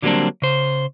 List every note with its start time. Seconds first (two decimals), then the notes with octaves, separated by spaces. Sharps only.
0.02 D3 F#3 G3 A#3 C4 D4
0.42 C#3 C5